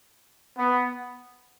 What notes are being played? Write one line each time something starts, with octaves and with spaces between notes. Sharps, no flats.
B3